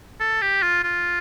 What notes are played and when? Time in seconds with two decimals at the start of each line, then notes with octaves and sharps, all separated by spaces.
0.21 A4
0.42 G4
0.63 F4
0.84 F4